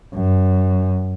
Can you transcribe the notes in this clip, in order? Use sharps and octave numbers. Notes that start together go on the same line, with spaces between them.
F#2